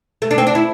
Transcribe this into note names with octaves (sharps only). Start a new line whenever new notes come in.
A3
D4
C4
D4
E4